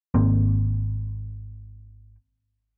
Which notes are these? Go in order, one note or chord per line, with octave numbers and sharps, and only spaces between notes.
G#1 A#3 C4